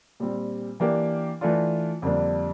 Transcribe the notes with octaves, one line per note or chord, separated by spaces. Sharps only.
A#2 G3 C4
E3 A#3 D4 G4
E3 A3 D4 F4
F2 D3 G3 A#3 D4